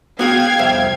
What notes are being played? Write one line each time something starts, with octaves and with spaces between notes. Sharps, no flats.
B3 F#4 G#4 F5 G5 G#6
C2 F2 E5